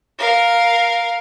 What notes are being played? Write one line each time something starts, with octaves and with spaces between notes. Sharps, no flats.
A#4 F5